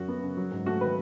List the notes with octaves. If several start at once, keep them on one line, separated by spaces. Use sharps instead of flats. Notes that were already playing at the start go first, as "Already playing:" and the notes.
Already playing: F#2 F#3 F#4
B3
C#3
F#3
G#2
A3 F#4
D#3 B4